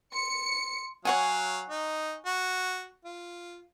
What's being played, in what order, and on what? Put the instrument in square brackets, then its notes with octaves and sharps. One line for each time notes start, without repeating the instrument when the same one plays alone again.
[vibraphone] C6 [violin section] C#7
[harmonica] F#3 F5 [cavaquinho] C#5 F#5 G#5
[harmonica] D#4
F#4
F4